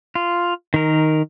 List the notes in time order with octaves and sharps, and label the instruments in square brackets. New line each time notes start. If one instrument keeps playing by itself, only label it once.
[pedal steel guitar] F4
D#3 A#4